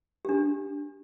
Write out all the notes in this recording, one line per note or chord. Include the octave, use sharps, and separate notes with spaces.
D4 G4